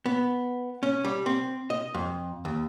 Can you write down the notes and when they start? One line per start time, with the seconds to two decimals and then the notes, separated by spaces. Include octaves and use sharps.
0.06 B3
0.83 C#4
1.05 G3
1.26 C4
1.70 D#5
1.94 F2
2.45 D#2